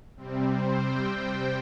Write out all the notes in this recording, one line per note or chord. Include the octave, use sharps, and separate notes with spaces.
C3 G3 C4
C5
G5
G5